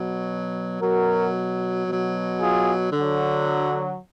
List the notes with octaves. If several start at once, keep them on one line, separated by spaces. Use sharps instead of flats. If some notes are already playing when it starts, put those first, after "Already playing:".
Already playing: B2 F#3
B2 F#3 F#4 A#4
B2 F#3
F4 G#4
D3
F#3